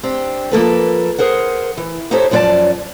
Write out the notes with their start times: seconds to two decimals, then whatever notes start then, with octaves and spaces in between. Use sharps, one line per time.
0.03 C4 D4 G4
0.52 F3 A#3 A4 B4
1.18 G#4 A#4 C5 F#5
1.77 E3
2.11 D#4 E4 G4 A4 C5 C#5
2.31 F#2 F3 B3 C#4 D5 A5